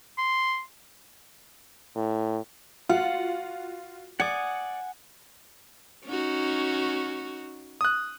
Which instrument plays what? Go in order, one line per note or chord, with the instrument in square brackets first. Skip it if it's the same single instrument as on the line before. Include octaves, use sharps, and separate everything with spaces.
[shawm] C6
[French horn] A2
[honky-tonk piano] F4 F#4 F5 [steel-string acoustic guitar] F#5
[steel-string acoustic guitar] D5 [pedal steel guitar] F#5 G#5 D#6 [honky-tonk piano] C#7
[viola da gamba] C#4 D#4 F#4
[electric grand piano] D#6 F#6